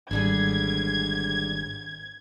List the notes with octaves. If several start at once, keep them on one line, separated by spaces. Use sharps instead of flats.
G#1 D3 G3 G#4 G#6